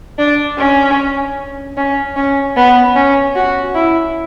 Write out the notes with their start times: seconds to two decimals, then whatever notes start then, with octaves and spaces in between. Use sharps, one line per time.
0.18 D4
0.58 C#4
1.77 C#4
2.16 C#4
2.56 B3
2.96 C#4
3.35 F#4
3.75 E4